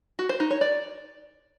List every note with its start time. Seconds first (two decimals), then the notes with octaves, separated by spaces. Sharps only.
0.19 F#4
0.29 C5
0.40 D#4
0.51 C#5
0.61 D5